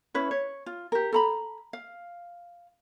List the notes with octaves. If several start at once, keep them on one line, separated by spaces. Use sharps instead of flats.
C#4 E4 B4 C#5
C#5
F4
G4 A#4
A4 A#5 B5
F5